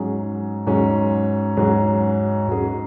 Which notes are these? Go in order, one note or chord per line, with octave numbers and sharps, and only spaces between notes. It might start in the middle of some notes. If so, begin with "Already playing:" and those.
Already playing: G#2 F#3 C#4 G#4
G#2 F#3 C#4 G#4
G#2 F#3 C#4 G#4
G#2 F#3 C#4 G#4